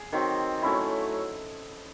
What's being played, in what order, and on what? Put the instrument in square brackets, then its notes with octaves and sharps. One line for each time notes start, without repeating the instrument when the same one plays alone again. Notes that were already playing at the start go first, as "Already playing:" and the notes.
Already playing: [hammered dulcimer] G#4
D#3 F#3 C4
F#3 A3 C#4 E4